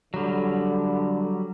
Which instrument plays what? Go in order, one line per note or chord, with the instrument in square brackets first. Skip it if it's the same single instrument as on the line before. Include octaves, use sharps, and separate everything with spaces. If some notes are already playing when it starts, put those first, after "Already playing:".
[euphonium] D3 [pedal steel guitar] F#3 G3